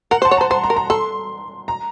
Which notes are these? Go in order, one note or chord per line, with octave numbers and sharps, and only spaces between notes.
A#4 F#5
C5
A5
C#5
C5 A#5
C5 C6
A#5
A#4
A#5
A4 C6
A#5